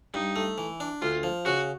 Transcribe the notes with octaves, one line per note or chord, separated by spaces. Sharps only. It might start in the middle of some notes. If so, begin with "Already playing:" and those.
G2 D#4
A3
E3
D4
D2 F4
F3
C#3 F#4